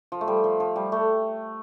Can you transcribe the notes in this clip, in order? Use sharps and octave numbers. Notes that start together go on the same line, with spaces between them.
F3
A3
G3
F3
F3
G3
A3